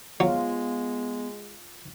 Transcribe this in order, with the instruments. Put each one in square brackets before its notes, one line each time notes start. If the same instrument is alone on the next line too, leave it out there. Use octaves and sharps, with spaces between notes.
[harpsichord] F#3 [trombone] G#3 [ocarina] B3 [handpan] F4